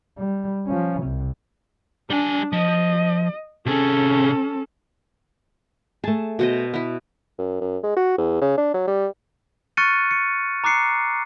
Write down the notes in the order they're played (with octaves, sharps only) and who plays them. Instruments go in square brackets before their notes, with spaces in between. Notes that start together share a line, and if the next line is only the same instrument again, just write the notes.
[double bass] G3
F3 C#4
C2 C3
[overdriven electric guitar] G3 G#5 [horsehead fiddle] D4
[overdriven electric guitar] F3 [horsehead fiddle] D#5
[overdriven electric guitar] C3 G#4 [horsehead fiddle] C#4 A4
[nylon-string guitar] A3 G#4 [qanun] A5
[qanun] B2 C5 D#5
B3 E4
[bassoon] F#2
F#2
G#3
F#4
E2
C#3
D4
F#3
G3
[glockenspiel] C#6 F6 F#6 A6 C#7 D#7
C#7
A#5 D6 F#6 C7 C#7